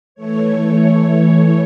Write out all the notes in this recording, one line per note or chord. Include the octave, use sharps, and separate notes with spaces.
E3 A3 C#5